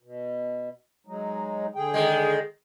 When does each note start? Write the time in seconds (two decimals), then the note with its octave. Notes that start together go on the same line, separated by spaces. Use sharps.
0.02 B2
1.07 F#3 G#3 D#4
1.76 D3 G#4 G5
1.94 D#3 G#3